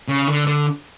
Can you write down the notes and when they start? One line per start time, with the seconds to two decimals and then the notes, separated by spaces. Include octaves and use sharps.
0.08 C#3
0.27 D3
0.47 D3